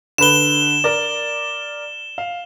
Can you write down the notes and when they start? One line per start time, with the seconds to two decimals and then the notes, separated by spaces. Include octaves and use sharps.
0.18 D3 B4 E7 G7
0.84 A#4 D5
2.18 F5